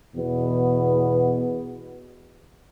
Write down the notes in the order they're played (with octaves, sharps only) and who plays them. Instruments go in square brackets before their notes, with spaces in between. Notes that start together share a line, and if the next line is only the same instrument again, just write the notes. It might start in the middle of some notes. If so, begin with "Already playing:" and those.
[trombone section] E2 B2 B3